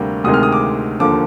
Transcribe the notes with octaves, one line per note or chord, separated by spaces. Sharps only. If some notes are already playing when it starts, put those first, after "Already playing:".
Already playing: D2 C3 G3 A#3
D2 C3 D#3 G#3 D#6
F6
D#6
D6
D#2 D3 F3 A#3 D6